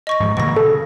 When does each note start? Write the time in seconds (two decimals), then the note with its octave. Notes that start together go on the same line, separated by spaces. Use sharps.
0.07 D#5 C#6 A#6
0.20 G#2 F3
0.37 A#2 D3 E3 C#6 A#6
0.57 C#3 A4